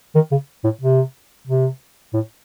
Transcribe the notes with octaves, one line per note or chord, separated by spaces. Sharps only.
D#3
C#3
A2
C3
C3
A2